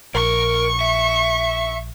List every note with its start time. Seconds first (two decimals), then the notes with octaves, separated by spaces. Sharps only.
0.15 A#1 A#4 C#6
0.81 E5